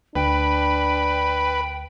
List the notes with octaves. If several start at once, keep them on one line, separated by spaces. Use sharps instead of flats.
D2 D4 B4 G5